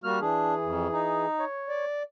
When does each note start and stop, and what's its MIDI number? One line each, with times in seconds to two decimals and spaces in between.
0.04 0.19 55
0.04 0.20 58
0.04 0.19 66
0.04 0.20 89
0.21 1.26 52
0.21 0.54 62
0.21 1.26 68
0.63 0.87 41
0.92 1.45 63
1.39 1.85 73
1.69 2.03 74